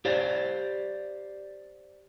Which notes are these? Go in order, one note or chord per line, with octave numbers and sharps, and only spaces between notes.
G4 C5 D5 F5